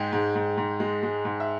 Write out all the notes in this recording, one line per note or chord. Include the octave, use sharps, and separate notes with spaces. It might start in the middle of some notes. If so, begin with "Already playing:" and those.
Already playing: G#2 G#3 G5
G#2
G#2
G#2
G#3
G#3
G#2
E5